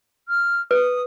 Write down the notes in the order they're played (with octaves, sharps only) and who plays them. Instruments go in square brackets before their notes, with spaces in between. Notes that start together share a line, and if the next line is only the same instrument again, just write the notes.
[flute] F6
[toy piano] B4 [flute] D#6